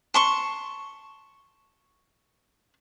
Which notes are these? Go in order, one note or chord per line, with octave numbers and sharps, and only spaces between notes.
A5 C6 C#6